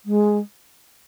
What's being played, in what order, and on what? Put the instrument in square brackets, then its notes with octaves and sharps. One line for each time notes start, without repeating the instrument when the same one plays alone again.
[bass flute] G#3